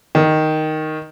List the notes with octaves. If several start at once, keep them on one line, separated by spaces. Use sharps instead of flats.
D#3